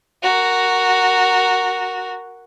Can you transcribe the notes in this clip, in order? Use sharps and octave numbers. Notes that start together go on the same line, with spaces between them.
F#4 A#4